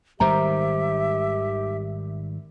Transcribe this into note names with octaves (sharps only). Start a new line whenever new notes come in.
G#1 D#3 G3 G4 A#4 C5 E5 A#5